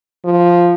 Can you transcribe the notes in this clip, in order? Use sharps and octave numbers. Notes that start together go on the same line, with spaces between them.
F3